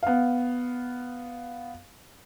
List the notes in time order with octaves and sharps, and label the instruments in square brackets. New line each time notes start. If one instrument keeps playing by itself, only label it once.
[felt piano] B3 F5